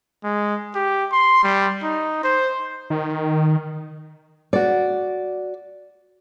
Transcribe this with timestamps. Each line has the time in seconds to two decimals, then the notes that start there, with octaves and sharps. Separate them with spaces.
0.24 G#3
0.75 G4
1.12 C6
1.43 G3
1.83 D#4
2.23 C5
2.90 D#3
4.53 F#4 D5